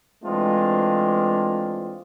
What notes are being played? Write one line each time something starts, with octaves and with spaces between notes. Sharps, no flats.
E3 G#3 A3 C4 D4 F4